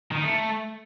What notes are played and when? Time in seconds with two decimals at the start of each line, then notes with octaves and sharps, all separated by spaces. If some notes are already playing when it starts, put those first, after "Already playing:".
0.12 D#3
0.18 D#4
0.24 A3